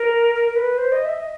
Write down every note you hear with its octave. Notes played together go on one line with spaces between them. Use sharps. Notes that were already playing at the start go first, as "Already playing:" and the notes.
Already playing: A#4
A#4
A#4
B4
C5
D#5
E5
D#5